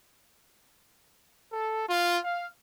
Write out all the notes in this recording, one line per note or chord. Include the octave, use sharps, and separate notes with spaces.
A4
F4
F5